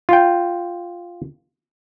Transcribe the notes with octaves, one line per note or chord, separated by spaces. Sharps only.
F4 G5